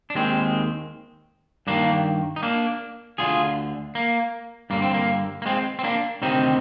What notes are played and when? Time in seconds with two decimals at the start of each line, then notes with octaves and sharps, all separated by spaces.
0.10 D4
0.15 D#2 D#3 G#3 C4
1.67 G2 D#3 A#3 D4
2.36 D#4
2.43 A#3 D4
3.18 D2 D3 F4 G#4
3.95 A#3
4.70 G2 D3 A#3
4.82 C4
4.94 A#3
5.42 A#3
5.46 G#3 C4
5.79 C4
5.84 A#3 D4
6.22 D2 C3 D#3 C4 D#4